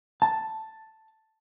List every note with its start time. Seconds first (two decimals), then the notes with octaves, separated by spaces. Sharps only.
0.22 A5